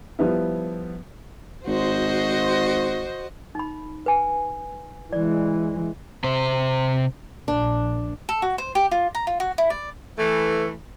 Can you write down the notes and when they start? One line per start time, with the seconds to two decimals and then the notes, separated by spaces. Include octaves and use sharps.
0.19 F3 G3 B3 E4
1.67 G#1 F#4 C5 D#5
3.55 D#4 B5
4.06 B4 G#5
5.13 E3 G#3 D5
6.24 C3 C5
7.48 A#1 D4
8.29 A4
8.42 F#4
8.58 C5
8.75 G4
8.91 F4
9.15 A#5
9.27 F4
9.40 F#4
9.58 E4
9.70 D5
10.18 E3 A3